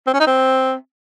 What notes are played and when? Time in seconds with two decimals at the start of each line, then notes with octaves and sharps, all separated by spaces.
0.07 C4
0.13 C#4
0.20 D#4
0.27 C4